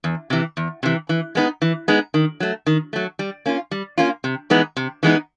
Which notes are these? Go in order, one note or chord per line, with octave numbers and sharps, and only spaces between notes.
E2
C3 E3
E2
C3 E3
E3
G#3 B3 D#4
E3
G#3 B3 D#4
D#3
F#3 A3
D#3
F#3 A3
G3
A#3 C#4 F4
G3
A#3 C#4 F4
C3
E3 G#3 B3 D#4
C3
E3 G#3 B3 D#4